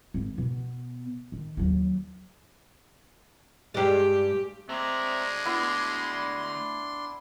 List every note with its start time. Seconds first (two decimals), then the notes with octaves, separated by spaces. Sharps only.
0.14 G#1
0.37 B2 B3
1.32 D#3
1.57 D#2 F#3
3.74 G2 G#3 G4
4.69 G#3 A3 C4 D5 E5 A#5
5.45 B3 D4 E4 C6